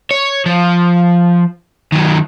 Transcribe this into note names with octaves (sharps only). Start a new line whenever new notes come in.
C#5
F3
D#3 F#3